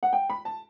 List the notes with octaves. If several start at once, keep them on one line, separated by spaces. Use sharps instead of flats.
F#5
G5
B5
A5